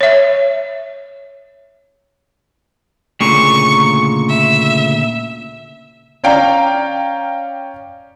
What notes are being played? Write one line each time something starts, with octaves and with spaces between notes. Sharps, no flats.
C#5 E5
D2 A#2 C#3 C#6
E5
C#4 D5 F5 G5 A#5